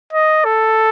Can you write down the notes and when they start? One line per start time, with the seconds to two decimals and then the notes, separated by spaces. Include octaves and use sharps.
0.13 D#5
0.45 A4